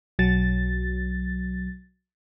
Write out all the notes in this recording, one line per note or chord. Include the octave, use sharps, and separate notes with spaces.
B1 F#3 A6